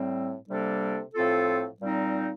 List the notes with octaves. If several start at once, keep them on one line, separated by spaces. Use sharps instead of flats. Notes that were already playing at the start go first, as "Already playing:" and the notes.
Already playing: A2 G3 C4
C3 G3 A#3 D4 A4
A2 F3 C4 F4 A4
A#2 G3 C4 D#4